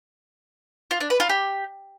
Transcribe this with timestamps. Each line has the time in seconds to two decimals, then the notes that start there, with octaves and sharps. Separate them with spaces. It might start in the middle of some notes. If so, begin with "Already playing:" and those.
0.91 F4
1.00 D4
1.10 B4
1.20 F4
1.29 G4